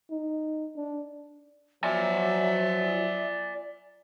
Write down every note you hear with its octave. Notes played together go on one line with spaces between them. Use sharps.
D#4
D4
F3 F#3 D5 E5 G#5